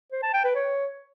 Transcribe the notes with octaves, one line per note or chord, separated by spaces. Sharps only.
C5
A5
G5
B4
C#5